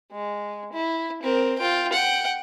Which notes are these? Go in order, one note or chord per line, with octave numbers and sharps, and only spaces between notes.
G#3
E4
C4 A#4
F4 G5
F#5 G5